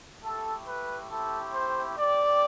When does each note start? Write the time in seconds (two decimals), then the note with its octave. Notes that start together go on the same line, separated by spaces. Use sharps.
0.22 A3 E4 G4 A4
0.66 B4
1.09 A3 C4 E4 G4 A4
1.54 C5
1.97 C4 G4 D5